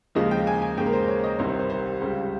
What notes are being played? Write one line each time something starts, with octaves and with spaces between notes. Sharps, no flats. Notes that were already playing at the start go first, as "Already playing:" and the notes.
D#2 C#3 F3 G#3 D#5
G5
G#5
G#5
D#2 C#3 G#3 G5
A#4
C5
C#5
D#5
C2 C3 D#3 G3 C5
C5
C5
C5
C#2 C#3 G3